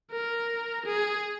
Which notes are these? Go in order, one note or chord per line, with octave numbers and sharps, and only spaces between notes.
A#4
G#4